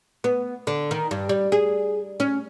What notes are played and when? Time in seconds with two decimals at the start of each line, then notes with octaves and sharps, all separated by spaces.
0.24 B3
0.67 D3
0.91 D#3
1.11 G2
1.29 G3
1.52 G#4
2.20 C#4